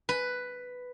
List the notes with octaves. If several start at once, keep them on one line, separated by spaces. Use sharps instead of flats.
B4